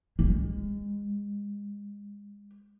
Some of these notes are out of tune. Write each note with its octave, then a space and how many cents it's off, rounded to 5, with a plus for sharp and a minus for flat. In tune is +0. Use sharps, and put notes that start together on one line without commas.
G#3 -30